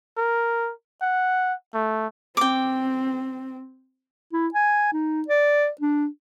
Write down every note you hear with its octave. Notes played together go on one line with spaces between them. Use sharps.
A#4
F#5
A3
C4 G5 D6
E4
G#5
D#4
D5
D4